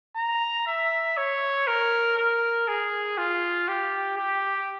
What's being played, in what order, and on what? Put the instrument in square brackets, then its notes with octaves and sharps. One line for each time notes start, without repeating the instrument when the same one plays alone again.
[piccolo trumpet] A#5
E5
C#5
A#4
A#4
G#4
F4
G4
G4